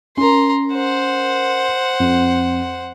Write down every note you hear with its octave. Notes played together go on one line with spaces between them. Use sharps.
C#4 A#4 A#5 C6
C5 F#5
F2